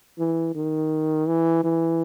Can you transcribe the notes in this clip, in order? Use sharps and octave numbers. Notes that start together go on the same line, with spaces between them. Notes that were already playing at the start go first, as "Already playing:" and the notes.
E3
D#3
E3
E3